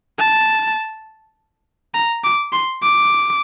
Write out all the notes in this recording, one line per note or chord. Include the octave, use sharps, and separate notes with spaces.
A5
A#5
D6
C6
D6